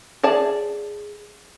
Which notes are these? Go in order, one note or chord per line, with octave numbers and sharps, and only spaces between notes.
G#4 D5 A5